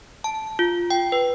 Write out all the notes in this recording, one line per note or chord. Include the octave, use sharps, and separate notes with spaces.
A5
F4
G5
B4